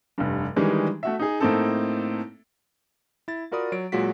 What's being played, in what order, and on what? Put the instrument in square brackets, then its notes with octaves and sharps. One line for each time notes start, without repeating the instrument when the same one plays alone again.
[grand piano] F1 G2
D#3 E3 G3 G#3 D4 G#4
A3 F#4 E5
D#4 G#4
A2 A#3 C4 D#4 A4
[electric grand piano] E4 A6
F4 F#4 A#4 D5 B5 D#6
F#3 D7
A#2 F#3 G#3 F4 F#4 B6